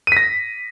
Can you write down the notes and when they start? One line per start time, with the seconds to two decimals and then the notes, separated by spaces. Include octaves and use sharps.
0.07 D#7
0.12 B6
0.17 A#6